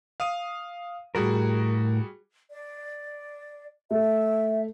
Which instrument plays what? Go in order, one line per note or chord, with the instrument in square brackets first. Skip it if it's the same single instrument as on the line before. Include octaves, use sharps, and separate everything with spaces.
[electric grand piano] F5 D#6 D#7
[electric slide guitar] A2 A#4 [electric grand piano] G3 F#4 G#4
[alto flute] D5
[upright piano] A3 [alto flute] E5